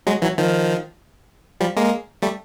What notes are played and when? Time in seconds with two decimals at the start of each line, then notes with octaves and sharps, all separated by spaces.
0.07 F#3 G#3
0.22 E3 F#3
0.38 D#3 F3
1.60 F3 G3
1.77 G#3 A#3
2.22 G3 A3